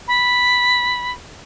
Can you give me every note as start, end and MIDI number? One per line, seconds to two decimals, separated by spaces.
0.08 1.12 83